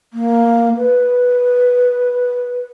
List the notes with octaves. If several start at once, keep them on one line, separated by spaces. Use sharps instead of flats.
A#3
B4